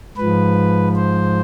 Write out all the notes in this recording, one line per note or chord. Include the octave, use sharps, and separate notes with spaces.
G#2 F3 B4
C5